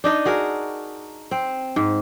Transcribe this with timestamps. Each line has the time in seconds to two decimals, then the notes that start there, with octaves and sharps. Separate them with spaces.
0.04 D4 D#4 D#5
0.25 F#4 G#4 A#4
1.31 C4
1.76 G#2